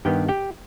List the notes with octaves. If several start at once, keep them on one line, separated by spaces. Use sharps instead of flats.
G2 D#3 B3 G4 G5
G4 G5